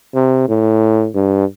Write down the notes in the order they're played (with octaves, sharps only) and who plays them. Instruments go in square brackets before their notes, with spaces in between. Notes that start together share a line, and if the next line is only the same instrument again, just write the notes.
[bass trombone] C3
A2
G2